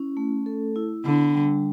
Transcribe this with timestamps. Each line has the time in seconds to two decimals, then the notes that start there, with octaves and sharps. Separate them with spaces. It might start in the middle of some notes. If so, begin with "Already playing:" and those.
Already playing: C#4 E4
0.17 A3
0.46 A4
0.76 E4
1.05 D3 B3
1.35 G3